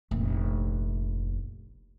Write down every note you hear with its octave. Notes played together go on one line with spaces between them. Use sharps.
F1 A#1